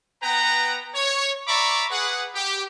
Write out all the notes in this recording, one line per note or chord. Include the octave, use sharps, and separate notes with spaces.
B3 B4 F#5 G5 A#5
C#5
D5 E5 A#5 B5 C#6 D6
G#4 B4 F#5
G4